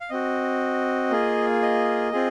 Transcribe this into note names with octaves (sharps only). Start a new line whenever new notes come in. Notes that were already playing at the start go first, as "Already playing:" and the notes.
F5
C4 F#4 D#5
A#3 F4 G#4
D#5
C4 F4 G#4